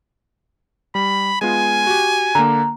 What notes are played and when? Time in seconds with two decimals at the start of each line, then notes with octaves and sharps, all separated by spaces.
0.95 G3 B5
1.41 G#3 B3 F4 G#5
1.87 F#4 G4
2.35 D3 A#3 A#5